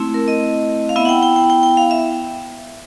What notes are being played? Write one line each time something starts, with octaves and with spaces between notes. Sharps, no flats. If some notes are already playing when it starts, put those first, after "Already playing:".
Already playing: A3 C4 E4
A#4
D#5
F5
B3 E4 E5
F#5
G5
G5
G5
G5
G5
F5
E5